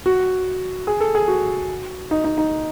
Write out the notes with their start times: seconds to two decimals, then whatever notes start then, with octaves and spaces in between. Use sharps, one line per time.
0.06 F#4
0.87 G#4
1.00 A4
1.15 G#4
1.28 F#4
2.11 D#4
2.24 D#4
2.38 D#4